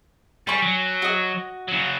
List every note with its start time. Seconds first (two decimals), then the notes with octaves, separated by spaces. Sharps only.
0.47 G3 G#5 C#6
0.62 F#3
1.02 F#4 D#5
1.68 C#3 F#3